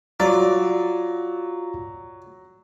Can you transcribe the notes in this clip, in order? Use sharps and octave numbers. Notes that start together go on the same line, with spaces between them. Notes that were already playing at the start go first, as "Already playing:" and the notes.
F#3 F4 F#4 D5